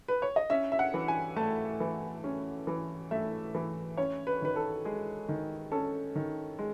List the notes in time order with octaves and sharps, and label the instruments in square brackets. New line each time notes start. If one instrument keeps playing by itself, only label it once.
[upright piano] B4
C#5
D#5
C#4 E5
E5
F#5
E3
G#5
A3 A5
E3
C#4
E3
A3 E5
E3
C#4 C#5
B4
D#3 B4
A4
G#3 G#4
D#3
C#4 A4
D#3
G#3